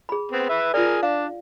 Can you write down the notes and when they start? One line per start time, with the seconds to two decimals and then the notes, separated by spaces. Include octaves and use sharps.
0.09 G#4 B5
0.32 B3 C4
0.49 B4 E5
0.74 F4 G#4 A#4 D5
1.03 D4 F5